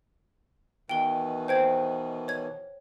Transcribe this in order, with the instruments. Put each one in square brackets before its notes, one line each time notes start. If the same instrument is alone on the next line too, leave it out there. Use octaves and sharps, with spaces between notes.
[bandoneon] B2 D#3 E3 [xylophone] G5 G7
[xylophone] C5 G5 G#6
C#5 G#6